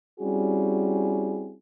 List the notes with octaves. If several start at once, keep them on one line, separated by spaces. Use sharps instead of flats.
G3 C4 C#4 E4 F#4 G#4